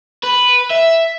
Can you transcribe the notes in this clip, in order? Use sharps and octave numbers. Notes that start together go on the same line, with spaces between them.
B4
E5